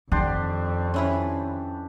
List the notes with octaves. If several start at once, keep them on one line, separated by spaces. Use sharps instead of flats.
F2 D#3 D4 G4 C6
C#4 E4 B4